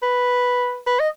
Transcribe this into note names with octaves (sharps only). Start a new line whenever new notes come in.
B4
B4
D#5